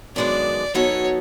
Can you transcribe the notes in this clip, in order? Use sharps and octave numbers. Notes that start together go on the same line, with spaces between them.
F#2 D#3 G#3 B3 D4 D5
F#3 B3 D#4 F#4 A4 C#5